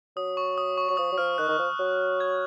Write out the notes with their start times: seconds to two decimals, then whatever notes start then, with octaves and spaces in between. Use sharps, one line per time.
0.16 F#3 D#6
0.37 C#6
0.58 D#6
0.77 C#6
0.89 F#3 C#6
0.97 F3 D#6
1.12 F#3
1.18 F3 F6
1.38 D#3 F#6
1.48 D#3
1.59 F3
1.79 F#3
2.20 G#6